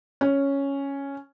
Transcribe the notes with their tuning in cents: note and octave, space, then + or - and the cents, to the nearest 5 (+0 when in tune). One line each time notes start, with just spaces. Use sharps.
C#4 +0